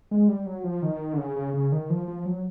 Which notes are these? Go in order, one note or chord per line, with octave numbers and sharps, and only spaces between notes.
G#3
G3
F#3
F3
D#3
D3
C#3
C#3
C#3
D#3
F3
F3
F#3